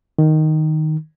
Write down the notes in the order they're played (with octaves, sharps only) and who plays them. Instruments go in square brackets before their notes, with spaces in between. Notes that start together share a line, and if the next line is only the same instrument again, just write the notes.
[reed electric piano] D#3